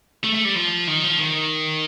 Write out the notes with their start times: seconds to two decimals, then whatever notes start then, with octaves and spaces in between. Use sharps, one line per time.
0.24 A3
0.35 A3
0.45 G3
0.56 F3
0.87 D#3
1.03 F3
1.18 D#3